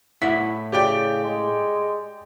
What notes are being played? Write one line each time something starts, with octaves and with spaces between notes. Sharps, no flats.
A2 E4 F#5 B6
C#3 G4 D5 G5
G#3